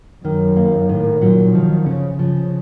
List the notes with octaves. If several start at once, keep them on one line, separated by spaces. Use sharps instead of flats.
F#2 D#3
A#3
A2 D#3
A#2 F#3
D#3 F3
C#3 C#4
C#3 F3